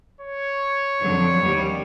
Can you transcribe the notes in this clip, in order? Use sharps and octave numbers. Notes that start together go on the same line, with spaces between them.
C#5
F2 D3 F#3
D#2 G3